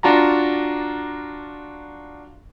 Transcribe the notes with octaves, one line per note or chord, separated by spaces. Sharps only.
D4 F4 F#4 A5 A#5